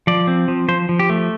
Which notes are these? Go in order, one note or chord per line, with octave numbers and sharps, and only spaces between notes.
F3 D5
C4
F3
F3 C5
F3
G4
A3